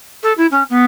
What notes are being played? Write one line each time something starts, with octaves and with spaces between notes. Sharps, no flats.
A4
E4
C#4
B3